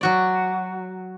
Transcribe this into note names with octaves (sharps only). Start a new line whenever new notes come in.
F#3 F#4 D5